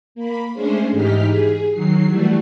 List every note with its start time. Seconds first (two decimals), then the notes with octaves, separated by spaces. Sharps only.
0.15 A#3 B5
0.53 G#3 A3 C#4 D4 G#4 C5
0.91 G#2 E3 D#4 G4 F6 B6
1.27 G#4
1.72 D#3 F#3 C7
2.07 E3 G3 A3 F#4